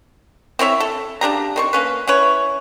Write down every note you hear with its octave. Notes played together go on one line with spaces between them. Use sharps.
C4 E4 C#5 E5
A4
C#3 D4 G4 A#5
D#3 C4 C#6
A#3 C#4 B4
C#4 E4 B4 C#5